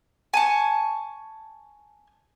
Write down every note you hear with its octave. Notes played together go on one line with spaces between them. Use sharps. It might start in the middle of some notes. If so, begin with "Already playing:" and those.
G#5 A5 C#6